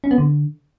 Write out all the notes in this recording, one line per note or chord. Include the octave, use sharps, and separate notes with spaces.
C#4
B3
D3